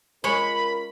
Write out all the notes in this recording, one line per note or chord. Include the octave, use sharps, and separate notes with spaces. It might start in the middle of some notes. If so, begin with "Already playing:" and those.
G#3 C#4 F4 G#4 A#4 C#5 B5